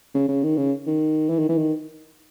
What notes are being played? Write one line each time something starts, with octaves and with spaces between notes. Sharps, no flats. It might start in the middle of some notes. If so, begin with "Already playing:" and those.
C#3
C#3
D#3
C#3
D#3
E3
D#3
E3
D#3